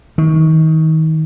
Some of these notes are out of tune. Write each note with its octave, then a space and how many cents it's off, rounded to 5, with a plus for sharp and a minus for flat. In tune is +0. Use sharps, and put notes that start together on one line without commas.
D#3 +30